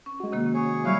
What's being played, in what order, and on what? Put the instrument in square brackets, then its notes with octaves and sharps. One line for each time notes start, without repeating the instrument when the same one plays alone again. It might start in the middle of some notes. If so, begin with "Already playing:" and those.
[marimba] C#4
[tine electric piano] G#3 F#4
[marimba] C3 D#3 A#3
[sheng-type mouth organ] G#4 C#5
[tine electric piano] F#3 G3 [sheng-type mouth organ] E4 C#5 F5 [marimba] D#6 F#6